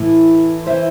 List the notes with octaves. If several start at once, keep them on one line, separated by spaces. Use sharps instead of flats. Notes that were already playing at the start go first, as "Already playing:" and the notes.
Already playing: A2 E3
E3 C5 E5